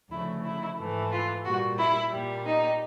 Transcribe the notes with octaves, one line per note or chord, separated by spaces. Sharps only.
D2 C#3 F3 A3 E4
E4
G#2 E3 A3
F4
A#2 G3 F#4
E4
A#2 G3
D#4